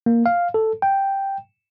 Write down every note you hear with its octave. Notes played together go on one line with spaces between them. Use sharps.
A#3
F5
A4
G5